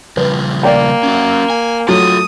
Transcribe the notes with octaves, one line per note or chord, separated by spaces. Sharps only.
C#3 F3 G3 B4
A#3 D5 G5
C#4 F#4
G#5
F#3 A3 F4 G4 D#6